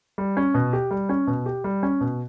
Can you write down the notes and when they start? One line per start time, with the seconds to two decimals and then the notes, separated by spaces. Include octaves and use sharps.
0.18 G3
0.37 C#4
0.54 B2
0.73 G4
0.91 G3
1.09 C#4
1.27 B2
1.46 G4
1.64 G3
1.83 C#4
2.01 B2